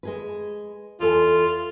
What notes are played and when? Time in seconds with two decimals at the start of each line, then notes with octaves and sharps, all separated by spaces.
0.03 G#3 G#4 B4
1.00 E2 F4 A4 G#5